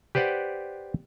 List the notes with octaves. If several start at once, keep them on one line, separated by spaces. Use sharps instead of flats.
G4 B4 C5 D5 F#5